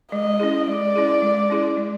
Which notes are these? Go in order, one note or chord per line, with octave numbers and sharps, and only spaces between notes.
G#3 D#5
C#4 E4 G#4
G#3 D5
C#4 E4 G#4
G#3
C#4 E4 G#4
G#3